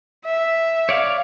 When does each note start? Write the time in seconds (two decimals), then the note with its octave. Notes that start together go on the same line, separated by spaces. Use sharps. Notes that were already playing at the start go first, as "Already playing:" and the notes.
0.25 E5
0.89 C#5 D5 F5